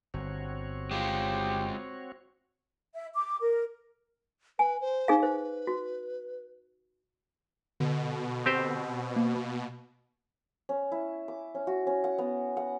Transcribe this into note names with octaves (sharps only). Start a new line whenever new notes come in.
G1 C4 F#4 C#5
G#3 F4 G4
E5
D6
A#4
B4 G#5
C5
D#4 G#4 F5
B4 C5
F#4
B2 D3
C4 G4 C5
A#3
C#4
E4
D6
C#4
F#4
C#4
F#5
B3
F#5